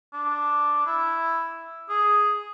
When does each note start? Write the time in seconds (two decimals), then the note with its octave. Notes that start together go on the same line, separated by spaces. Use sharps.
0.13 D4
0.86 E4
1.89 G#4